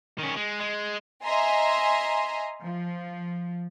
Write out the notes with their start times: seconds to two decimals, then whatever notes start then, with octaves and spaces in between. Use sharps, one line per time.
0.19 D#3 C#4
0.36 G#3
0.60 G#3
1.24 D#5 E5 G#5 A#5 C6
2.60 F3